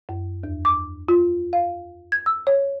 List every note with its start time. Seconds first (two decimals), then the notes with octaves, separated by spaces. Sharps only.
0.09 F#2
0.43 E2
0.65 D6
1.08 F4
1.53 F5
2.12 G#6
2.26 E6
2.47 C#5